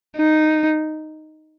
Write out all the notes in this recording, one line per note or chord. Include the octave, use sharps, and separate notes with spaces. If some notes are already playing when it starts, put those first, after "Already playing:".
D#4